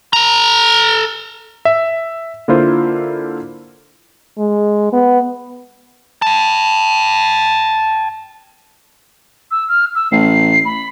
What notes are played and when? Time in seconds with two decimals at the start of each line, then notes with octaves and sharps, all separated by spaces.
0.13 A4 A#5
1.65 E5
2.48 D3 A#3 E4 F4 C5
4.38 G#3
4.93 B3
6.22 G5 A5
9.51 E6
9.68 F6
9.95 E6
10.11 A1 C7
10.65 B5